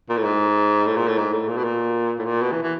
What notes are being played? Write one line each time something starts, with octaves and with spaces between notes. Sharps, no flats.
A#2
A2
G#2
A2
A#2
A2
G#2
A2
A#2
B2
A#2
A2
A#2
B2
E3
E3